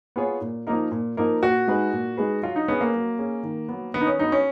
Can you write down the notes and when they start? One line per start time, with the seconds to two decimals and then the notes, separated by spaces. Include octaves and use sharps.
0.16 B3 F4 G#4 C#5
0.41 A#2
0.67 F3 A#3 D#4 A#4
0.91 A#2
1.17 F3 A#3 D#4 A#4
1.42 A#2 F#4
1.68 G#3 D#4 G#4 B4
1.93 A#2
2.17 G#3 D#4 G#4 B4
2.43 F#3 F4
2.56 D#4
2.68 B3 C#4 G#4
2.81 A#3
2.94 F#3
3.19 C#4 G#4
3.43 D#3
3.69 F#3 B3
3.94 D#3 B3
4.01 D#4
4.07 C#4
4.19 F#3 B3 D#4
4.32 C#4